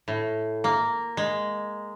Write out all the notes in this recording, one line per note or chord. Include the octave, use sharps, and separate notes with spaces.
A2
A#3
G#3